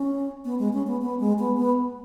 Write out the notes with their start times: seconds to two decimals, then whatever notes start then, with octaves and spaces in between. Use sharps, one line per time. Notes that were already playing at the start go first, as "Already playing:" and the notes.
Already playing: C#4
0.45 B3
0.59 G#3
0.73 C#4
0.87 B3
1.02 B3
1.20 G#3
1.39 B3
1.57 B3